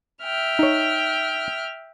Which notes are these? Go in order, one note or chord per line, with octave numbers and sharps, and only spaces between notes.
E5 G5 F6
D#4 C#5